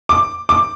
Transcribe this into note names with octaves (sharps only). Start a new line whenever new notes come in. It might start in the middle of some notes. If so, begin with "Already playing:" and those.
D6
D6